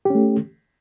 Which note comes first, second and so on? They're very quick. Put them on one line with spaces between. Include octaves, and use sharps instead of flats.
G4 C#4 A3